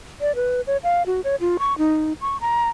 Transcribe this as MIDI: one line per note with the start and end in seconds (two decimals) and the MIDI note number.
0.21 0.35 74
0.35 0.61 71
0.67 0.77 73
0.84 1.03 77
1.06 1.21 66
1.24 1.36 73
1.40 1.57 65
1.59 1.77 85
1.78 2.13 63
2.21 2.37 85
2.41 2.69 82